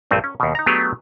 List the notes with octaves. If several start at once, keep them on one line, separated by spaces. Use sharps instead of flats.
A#1 G2 A3 C4
C#4
D#2 B2
D#4 A#5
F#3 A3 B3 D4 G4 G#4